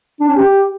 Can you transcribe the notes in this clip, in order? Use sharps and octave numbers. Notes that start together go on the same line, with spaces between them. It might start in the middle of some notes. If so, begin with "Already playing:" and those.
D4
C#4
G4